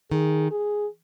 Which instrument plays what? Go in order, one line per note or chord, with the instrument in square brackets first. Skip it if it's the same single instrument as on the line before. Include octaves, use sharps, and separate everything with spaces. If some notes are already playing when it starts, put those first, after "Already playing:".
[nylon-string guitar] D#3 [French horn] G#4
[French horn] G#4